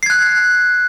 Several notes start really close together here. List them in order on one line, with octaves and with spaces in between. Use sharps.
C7 G#6 F#6